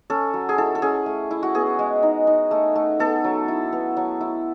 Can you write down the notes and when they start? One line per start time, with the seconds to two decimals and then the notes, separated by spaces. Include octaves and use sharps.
0.10 C#4 A4
0.34 F#3
0.49 G#4
0.58 E4 A4
0.75 A4
0.82 C#4 G#4
1.06 A3
1.31 E4
1.43 F#4
1.54 B3 G#4
1.79 G#3
2.03 D#4
2.27 D#4
2.51 A3
2.76 A3
3.00 B3 A4
3.24 F#3
3.48 E4
3.72 B3
3.97 F#3
4.21 E4